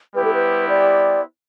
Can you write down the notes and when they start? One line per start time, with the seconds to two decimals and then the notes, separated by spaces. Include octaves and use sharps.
0.14 G3 B3 E4 G4 B4 C5
0.24 A4
0.34 B4
0.69 D5